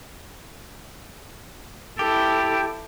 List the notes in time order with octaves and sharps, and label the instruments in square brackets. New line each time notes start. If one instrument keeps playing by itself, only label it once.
[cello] E4 A4 [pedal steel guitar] G4